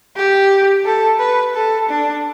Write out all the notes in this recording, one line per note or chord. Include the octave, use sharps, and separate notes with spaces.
G4
A4
B4
A4
D4